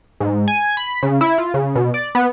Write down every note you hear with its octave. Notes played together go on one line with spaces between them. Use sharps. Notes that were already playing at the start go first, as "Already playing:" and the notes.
G#2
G#5
B5
C#3
E4
F4
C#3
B2
D5
B3